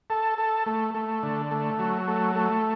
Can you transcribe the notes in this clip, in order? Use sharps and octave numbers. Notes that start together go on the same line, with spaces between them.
A4
A4
A3
A3
D3
A3
F#3
A3
A3